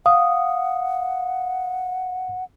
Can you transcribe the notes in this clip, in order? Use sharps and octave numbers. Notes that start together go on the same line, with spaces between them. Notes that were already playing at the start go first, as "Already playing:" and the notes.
F5 F#5 D#6